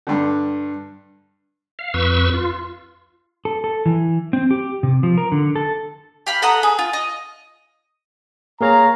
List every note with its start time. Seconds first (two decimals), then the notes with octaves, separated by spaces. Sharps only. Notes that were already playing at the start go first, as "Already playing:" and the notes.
0.07 G2 D3
1.79 F5
1.94 F2 B4 C#6 E6
2.33 F4
3.45 A4
3.64 A4
3.86 E3
4.33 C4
4.51 G4
4.83 C3
5.03 F3
5.18 A#4
5.32 D3
5.56 A4
6.27 G4 F5 B5
6.42 A4 F#5 A#5 D#6
6.63 G#4
6.79 F4
6.93 D#5
8.61 A#3 G#4 C#5 F5 A#5